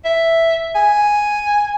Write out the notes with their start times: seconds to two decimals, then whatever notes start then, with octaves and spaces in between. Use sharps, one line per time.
0.05 E5
0.75 G#5